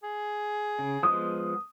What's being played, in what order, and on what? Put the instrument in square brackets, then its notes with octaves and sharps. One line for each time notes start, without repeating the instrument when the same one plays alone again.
[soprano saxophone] G#4
[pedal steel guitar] C#3
[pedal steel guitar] F3 G#3 B3 [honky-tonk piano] D#6